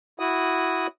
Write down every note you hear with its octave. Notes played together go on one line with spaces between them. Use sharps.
E4 F#4 D#6